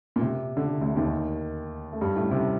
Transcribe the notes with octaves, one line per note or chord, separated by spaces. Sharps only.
A#2
C3
D3
C3
D2 D3
D#2 D#3
A3
G2 G3
A2 A3
C3 C4